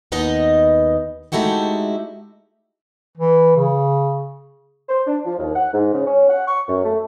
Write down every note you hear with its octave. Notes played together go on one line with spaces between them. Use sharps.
D#2 B3 D#4 B4 D#5
G#3 A3 D#4 E4 F#4 G4
E3
C#3
C5
D4
F3
D#2
F#5
G#2
C#3
C#4
F#5
C#6
F#2
A3